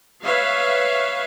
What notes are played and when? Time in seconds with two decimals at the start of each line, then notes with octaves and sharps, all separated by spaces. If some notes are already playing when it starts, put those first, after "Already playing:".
0.23 B4 C#5 E5 F5